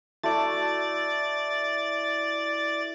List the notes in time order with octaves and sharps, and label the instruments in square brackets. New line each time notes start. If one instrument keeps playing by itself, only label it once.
[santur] A3 E4 F#4 [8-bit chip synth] D5 A6